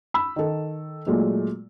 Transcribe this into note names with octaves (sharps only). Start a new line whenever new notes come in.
B5 E6
D#3 A4
A#2 F#3 G#3 A3